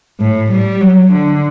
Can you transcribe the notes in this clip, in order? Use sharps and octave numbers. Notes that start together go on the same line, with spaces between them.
A2
G3
F#3
D3